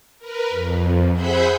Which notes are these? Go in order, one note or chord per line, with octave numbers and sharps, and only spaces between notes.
A#4 B4
F2
G#4 C5 E5 F#5 B5 G6